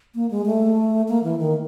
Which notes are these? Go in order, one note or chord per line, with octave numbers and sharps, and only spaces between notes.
A#3
G#3
A3
A#3
E3
D#3